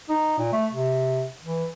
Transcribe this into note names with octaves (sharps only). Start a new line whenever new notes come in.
D#4
A#2
A3
C3
E3